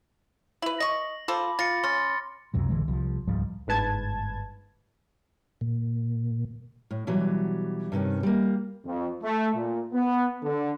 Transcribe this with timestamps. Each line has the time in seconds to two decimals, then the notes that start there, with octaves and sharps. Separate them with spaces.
0.62 E4 B4 F#7
0.80 D#5 C#6 A#6
1.28 F4 A4 C5 B5 D6
1.59 F4 A6 A#6 C#7
1.83 C#4 C6 F6 A6
2.54 C#2 F#2 C3 F#3
2.69 A#1 D3 E3 G#3
2.88 C2 F3
3.27 C#2 G#2 F3 G3
3.67 G1 G#2 B4 A5 G#6
5.61 A#2
6.91 A2
7.07 B2 E3 F#3 G3
7.92 G2 C3 D#3 C#4
8.23 G3 A#3
8.85 F2
9.22 A3
9.55 A#2
9.94 B3
10.43 D3